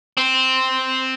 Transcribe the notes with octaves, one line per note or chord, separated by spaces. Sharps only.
C4